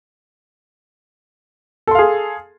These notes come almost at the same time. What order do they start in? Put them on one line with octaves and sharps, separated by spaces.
A4 C6 F5 G#4